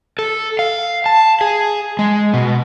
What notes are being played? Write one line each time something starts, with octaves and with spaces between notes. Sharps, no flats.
A4
F5
A5
G#4
G#3
B2